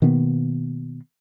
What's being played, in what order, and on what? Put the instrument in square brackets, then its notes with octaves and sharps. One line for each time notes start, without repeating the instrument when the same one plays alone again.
[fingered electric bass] B2 D#3 A#3 B3